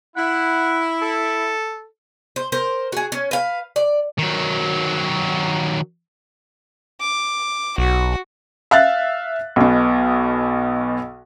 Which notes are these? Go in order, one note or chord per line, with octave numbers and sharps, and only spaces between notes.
E4 F#5
A4
C5
A#4 C5
F#4 G#4
C#4
B4 F5
D5
D#3 F#3
D6
B1 F#4
E5 F5 F#6 A6
B1 B2